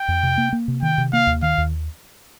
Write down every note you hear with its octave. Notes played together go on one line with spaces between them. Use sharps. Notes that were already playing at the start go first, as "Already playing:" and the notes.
Already playing: G5
F2
C3
A#3
A#3
C3
D#3 G5
C3
A#3 F5
D#2
D#3 F5
D#2